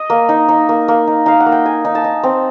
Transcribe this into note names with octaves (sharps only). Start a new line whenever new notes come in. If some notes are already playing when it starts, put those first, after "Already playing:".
Already playing: D#5
A#3
D#4
D#4
A#3
A#3
D#4
D#4 F5
F#5
A#3
G5
A#3 G#5
D#4
A5
D#4
C4